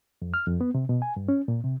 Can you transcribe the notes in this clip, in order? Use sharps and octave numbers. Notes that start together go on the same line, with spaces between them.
F2
F6
F2
B3
C3
B2
G#5
G2
C#4
A#2
C3